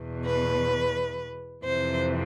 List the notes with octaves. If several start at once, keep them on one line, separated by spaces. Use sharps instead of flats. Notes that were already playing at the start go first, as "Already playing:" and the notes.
Already playing: E2 B2
B4
F2 C3 E3 C5